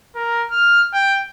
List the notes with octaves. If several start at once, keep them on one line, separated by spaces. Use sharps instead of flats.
A#4
F6
G5